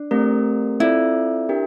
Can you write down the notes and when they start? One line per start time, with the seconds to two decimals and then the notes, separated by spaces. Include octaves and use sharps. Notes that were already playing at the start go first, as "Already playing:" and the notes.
Already playing: D4
0.11 A3 C4 G4 A#4
0.80 C4 E4 F4 A4 D5
1.49 D4 G4 A#4